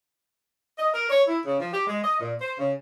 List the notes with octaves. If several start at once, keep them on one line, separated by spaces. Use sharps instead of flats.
D#5
A#4
C#5
E4
C#3
F3
G4
G#3
D#5
A#2
C5
C#3